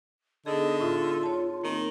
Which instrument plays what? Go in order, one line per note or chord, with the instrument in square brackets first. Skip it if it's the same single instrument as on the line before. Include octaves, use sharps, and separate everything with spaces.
[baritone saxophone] D3 [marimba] B3 D#4 G#4 [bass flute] D#5
[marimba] A2 E4 E5 [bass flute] F4
[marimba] C#5 A5
[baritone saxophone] D#3 [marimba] A#3 C4